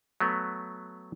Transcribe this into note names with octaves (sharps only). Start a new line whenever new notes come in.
F#3 A3 B3